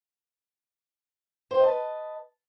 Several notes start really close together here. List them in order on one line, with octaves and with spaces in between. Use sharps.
C5 G5 D#5 A5 B4